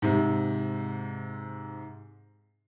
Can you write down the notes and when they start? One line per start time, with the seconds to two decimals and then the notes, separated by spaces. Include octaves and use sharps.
0.02 G#2 C3